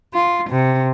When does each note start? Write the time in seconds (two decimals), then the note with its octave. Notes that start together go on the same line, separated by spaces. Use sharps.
0.13 F4
0.50 C3